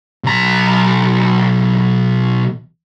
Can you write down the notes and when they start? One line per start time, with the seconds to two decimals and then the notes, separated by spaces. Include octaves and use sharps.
0.24 B1 A#5